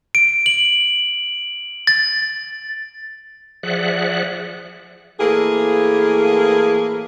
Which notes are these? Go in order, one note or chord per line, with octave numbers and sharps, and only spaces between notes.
D7
F#7
A6
F3 G#4 D5 E5 F#5 F#6
A2 E3 A#3 G#4